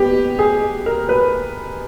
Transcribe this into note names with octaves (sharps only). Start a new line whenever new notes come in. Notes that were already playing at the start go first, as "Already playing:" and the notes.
Already playing: B3 G4
G#4
A#4
B4